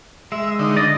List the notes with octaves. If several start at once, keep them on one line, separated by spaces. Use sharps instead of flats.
G#3 E5
D3 D#4
D5 D#5